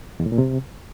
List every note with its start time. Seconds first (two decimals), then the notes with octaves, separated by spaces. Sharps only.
0.20 E2
0.26 A2
0.32 A#2
0.38 C3